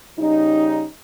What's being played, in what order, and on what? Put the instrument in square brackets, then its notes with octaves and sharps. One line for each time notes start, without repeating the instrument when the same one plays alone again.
[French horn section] C#3 G3 D#4